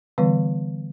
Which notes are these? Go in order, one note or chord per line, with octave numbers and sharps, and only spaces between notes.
D3 E3 G3 B3 B4